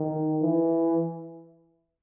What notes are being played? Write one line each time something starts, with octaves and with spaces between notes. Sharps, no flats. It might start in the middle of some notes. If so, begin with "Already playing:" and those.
Already playing: D#3
E3